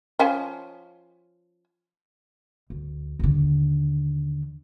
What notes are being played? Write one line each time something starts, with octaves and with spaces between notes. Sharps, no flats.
F3 C#4 G#5
D2
D#2 D3